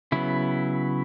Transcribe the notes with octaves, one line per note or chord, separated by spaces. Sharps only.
C#3 F#3 B3 E4